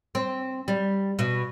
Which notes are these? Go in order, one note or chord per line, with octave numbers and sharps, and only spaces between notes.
C4
G3
B2